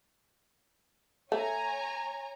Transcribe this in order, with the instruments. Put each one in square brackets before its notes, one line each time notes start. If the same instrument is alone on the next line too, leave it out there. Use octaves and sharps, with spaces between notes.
[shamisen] A3 [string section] C#5 G#5 A#5